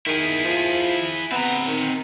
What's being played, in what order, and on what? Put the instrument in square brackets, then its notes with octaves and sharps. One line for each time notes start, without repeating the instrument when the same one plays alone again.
[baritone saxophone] D#3 [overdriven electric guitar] E4 G#4
[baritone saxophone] F3
[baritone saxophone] B3 [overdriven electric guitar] C4 A#5
[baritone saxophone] D#3